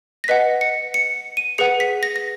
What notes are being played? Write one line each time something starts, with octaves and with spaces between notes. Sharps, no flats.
A#6
B4 D#5 F#5 B6
C#7
C#7
D#7
G#4 B4 F#5 C#7
B6
A#6
A#6